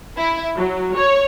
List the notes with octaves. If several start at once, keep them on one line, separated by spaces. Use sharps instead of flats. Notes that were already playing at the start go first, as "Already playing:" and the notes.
E4
F#3
C#5